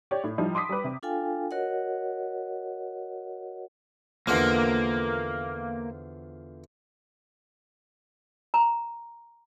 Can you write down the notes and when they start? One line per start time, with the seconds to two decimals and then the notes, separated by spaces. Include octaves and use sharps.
0.11 G4 C#5 D5
0.24 A2
0.38 F3 G3 D#4 E4
0.55 C6 D6 D#6 B6
0.69 G3 B4
0.84 C3
1.03 D4 F4 A4 F5 G5 G#5
1.51 F#4 A#4 C#5 D#5 F#5
4.27 E2 D3 F3 A#3
8.54 A#5